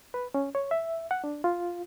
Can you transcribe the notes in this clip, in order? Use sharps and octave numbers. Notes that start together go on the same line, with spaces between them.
B4
C#4
C#5
E5
F#5
D4
F4